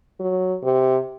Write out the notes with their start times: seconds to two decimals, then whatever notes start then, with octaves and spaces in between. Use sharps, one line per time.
0.20 F#3
0.63 C3